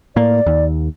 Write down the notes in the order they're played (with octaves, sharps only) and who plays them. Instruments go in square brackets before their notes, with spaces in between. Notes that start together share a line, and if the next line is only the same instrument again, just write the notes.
[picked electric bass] A2 A#3 [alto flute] D5
[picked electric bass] D#2